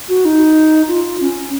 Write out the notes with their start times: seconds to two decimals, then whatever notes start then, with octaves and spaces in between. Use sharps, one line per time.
0.09 F#4
0.25 D#4
0.88 F4
1.21 C#4